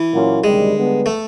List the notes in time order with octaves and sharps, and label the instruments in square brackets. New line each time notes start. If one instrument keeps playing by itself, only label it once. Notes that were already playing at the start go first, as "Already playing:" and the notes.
Already playing: [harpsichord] E3
[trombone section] A#2 F#3 A#3 C#4 F4
[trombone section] D2 C3 D#3 G3 [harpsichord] G#3
[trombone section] D3 G3 B3 D4
[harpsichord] A3